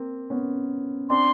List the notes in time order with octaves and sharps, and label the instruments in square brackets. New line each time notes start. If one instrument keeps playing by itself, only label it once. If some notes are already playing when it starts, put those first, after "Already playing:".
Already playing: [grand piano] A#3 C4
B3 C#4
[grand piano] C4 D4 [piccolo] C6